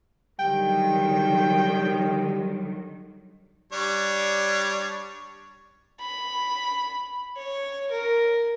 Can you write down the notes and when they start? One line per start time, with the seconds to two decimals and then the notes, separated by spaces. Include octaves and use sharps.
0.39 D3 D#3 F#3 G3 G5
3.73 G3 D4 C#5
6.00 B5
7.37 C#5
7.91 A#4